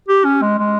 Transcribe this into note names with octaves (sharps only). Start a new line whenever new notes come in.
G4
C#4
G#3
G#3